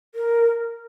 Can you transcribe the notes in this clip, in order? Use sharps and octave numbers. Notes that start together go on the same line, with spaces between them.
A#4